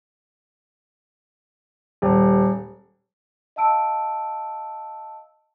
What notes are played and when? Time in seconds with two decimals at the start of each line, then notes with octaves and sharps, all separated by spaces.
2.02 D#1
3.56 D#5 F5 A5 E6 D7